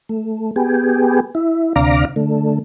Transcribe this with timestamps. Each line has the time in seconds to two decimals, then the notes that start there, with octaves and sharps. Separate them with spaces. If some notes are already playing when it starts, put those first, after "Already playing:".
0.09 A3
0.56 B3 G4 G#4
1.35 E4
1.76 D2 C3 D4 F5 A#5 D6
2.16 D3 A3